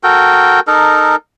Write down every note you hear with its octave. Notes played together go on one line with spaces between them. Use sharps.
F#4 A4 A#4 G5
D#4 A4 A#4